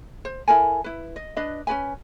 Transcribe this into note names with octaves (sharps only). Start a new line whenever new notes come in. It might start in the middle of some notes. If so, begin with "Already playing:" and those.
C5
E4 A4 A#4 G#5
E4 B4
D#5
D4 B4 D#5
C#4 F#4 B4 G#5